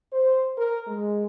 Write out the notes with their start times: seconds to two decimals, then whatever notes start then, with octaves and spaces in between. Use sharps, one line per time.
0.13 C5
0.58 A#4
0.88 G#3